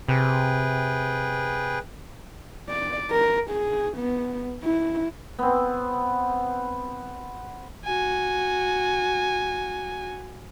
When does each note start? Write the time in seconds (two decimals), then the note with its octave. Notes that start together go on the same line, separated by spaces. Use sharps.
0.08 C3 G#4 B4 G5
2.70 D5
3.11 A#4
3.51 G#4
3.97 B3
4.63 E4
5.39 B3 C4
7.85 F#4 G#5